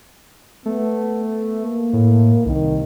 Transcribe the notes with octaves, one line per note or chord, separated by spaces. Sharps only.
A3 B3
A#3
A2
C2 D#3